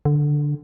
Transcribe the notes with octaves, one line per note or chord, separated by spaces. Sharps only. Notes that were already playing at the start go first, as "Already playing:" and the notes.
D3